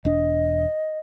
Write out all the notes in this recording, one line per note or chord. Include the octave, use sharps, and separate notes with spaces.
E1 D4 D#5